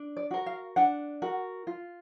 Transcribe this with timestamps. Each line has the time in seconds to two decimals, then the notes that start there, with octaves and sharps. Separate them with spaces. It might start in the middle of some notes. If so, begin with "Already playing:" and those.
Already playing: D4
0.17 D5
0.31 F#4 A#4
0.46 F5
0.76 D4 F#5
1.22 F#4 A#4
1.67 F4